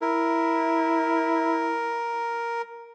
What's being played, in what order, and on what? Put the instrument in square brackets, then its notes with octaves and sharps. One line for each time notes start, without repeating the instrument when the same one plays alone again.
[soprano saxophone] E4 [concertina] A#4